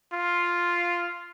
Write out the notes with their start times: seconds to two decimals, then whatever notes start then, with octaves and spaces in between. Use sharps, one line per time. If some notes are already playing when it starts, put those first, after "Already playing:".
0.13 F4